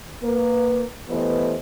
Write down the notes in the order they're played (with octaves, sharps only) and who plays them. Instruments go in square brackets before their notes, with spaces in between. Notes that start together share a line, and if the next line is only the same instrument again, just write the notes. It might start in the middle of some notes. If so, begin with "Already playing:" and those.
[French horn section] A#3 B4
E3 A3 B3 G4 C5 D#5